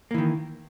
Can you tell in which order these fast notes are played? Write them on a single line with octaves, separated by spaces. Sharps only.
A#3 E3 D#3